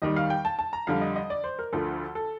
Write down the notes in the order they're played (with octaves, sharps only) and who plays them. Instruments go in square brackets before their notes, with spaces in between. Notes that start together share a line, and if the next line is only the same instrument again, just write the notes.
[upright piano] D#2 D#3 G3 D#5
F5
G5
A5
A5
A#5
F2 D3 G3 F5
D#5
D#5
D5
C5
A#4
D2 D3 F3 A4
A4